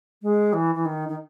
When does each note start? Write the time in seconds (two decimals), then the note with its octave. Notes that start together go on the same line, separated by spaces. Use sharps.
0.22 G#3
0.53 E3
0.75 E3
0.86 D#3
1.09 D#3